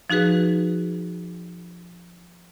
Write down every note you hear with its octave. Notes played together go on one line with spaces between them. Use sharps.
F3 D#4 F#4 G#4 B4